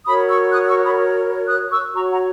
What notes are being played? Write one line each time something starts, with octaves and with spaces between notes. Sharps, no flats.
F#4 A#4 C#5 B5 D#6
C#6 E6
D#6 F#6
C#6 E6
B5 D#6
D#6 F#6
C#6 E6
F#4 C#5 A#5 C#6
F#5 A#5